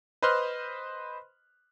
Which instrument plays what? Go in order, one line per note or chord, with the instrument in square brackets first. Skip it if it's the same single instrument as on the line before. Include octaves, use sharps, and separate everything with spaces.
[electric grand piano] B4 C5 D#5 C6 F6 F#6